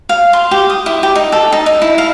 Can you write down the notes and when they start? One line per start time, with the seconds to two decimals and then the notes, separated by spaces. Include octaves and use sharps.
0.09 F5
0.33 C6
0.51 G4
0.70 D#6
0.86 E4
1.03 G4
1.16 D#4
1.32 A4
1.53 D#4
1.66 D#4
1.82 E4
1.98 F5